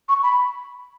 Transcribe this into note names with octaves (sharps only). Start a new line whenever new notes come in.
C#6
B5